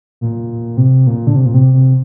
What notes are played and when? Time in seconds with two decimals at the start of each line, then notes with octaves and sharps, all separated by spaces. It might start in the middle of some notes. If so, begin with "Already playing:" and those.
0.21 A#2
0.77 C3
1.07 A#2
1.27 D3
1.36 C3
1.46 A#2
1.54 C3
1.73 C3